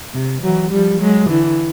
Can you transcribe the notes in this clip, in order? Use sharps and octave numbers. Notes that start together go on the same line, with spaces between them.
C3
E3 F#3
F3 G3
F#3 G#3
D3 E3